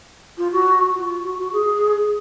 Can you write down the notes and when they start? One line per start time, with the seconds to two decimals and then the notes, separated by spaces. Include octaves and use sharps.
0.38 F4
0.52 F#4
0.95 F4
1.24 F#4
1.39 F#4
1.53 G#4